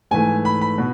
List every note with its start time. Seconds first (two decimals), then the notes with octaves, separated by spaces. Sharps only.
0.11 G#2 E3 A3 G#5
0.45 B5
0.61 B5
0.78 B2